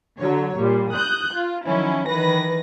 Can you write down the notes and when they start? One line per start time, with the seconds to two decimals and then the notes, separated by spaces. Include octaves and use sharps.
0.18 D3 F#3 C#5
0.57 A#2 G3
0.91 D#6 F#6 G6
1.33 F4
1.66 D#3 F3 F#3 C#4 E4
2.07 D#3 E3 B4 A#6